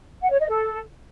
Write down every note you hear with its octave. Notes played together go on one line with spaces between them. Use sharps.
F#5
C#5
D#5
A4